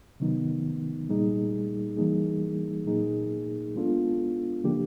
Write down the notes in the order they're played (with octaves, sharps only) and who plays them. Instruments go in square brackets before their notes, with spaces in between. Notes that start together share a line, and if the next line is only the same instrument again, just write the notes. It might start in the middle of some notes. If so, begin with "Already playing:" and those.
[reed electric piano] C3 D#3 F#3 B3 D#4
A#2 G3 A#3 D#4 G#4
E3 G3 A#3 D#4 G#4
A#2 F#3 A#3 D#4 G#4
G#3 B3 D4 F4 A4
C#3 F3 A#3 D4 G4